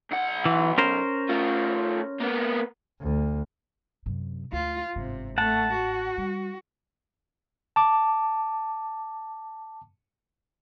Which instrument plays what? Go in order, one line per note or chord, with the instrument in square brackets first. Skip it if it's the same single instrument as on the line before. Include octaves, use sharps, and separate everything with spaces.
[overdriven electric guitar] B1 F#5
[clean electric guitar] E3
C#4 A#4 C5
[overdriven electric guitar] A3 F4
A#3 B3
[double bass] D2
[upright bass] F#2 C3
[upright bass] D2 [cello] F4
[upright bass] G1 G#2 [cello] C3
[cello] A3 [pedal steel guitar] F#5 A5
[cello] F#4
[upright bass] G3
[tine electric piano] A5 D6